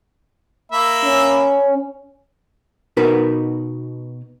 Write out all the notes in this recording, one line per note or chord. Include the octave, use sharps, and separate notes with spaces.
A#3 E5 B5
C#4
B2 D#4 F#4 A#4 B4